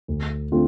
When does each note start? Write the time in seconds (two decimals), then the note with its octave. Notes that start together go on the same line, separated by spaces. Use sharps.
0.08 D2
0.52 D3 A3 C4 F4